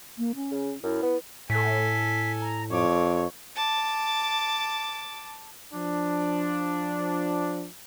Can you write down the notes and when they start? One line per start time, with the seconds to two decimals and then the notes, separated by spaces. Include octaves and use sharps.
0.18 A#3
0.36 C#4
0.51 C#3
0.83 F#2 E4
1.02 B3
1.50 A2 A4 G#5 B6
2.41 A#5
2.71 F2 C#5 D6
3.56 A5 D6
5.73 F3 D4